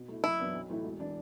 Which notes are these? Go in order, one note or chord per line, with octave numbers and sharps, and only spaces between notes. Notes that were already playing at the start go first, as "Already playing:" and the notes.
Already playing: B2
A3 E4
F#1 E4
F#2 E3 B3 D4
B1
A2 E3 A3 E4
E1
E3 D4